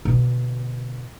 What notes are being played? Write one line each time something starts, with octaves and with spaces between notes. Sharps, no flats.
B2 D3